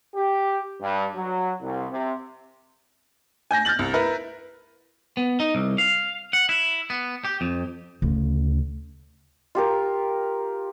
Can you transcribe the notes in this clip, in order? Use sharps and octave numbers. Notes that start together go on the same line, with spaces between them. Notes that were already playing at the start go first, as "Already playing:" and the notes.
G4
G2
F#3
C2
C3
G#5 G6 A#6
F6 G6 A6 F#7
C2
E4 A#4 B4
B3
D#4
C2
F5
F#5
E4
B3
G4
F2
D2 C#3
F4 G4 A#4